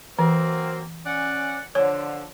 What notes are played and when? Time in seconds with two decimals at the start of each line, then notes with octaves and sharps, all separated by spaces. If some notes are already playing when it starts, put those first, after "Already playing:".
0.19 E3 F#3 A#3 C4
1.06 C#4 D5 F#5
1.75 D3 F3 C#5